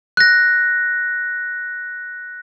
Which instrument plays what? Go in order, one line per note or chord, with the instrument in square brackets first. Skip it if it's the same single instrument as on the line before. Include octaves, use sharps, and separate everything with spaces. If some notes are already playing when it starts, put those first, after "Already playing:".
[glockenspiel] F#6 A#6